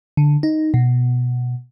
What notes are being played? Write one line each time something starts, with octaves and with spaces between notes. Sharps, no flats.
D3
D#4
B2